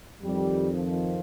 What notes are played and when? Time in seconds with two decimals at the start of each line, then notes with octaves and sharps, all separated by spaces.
0.23 F2 D#3 G3
0.74 F3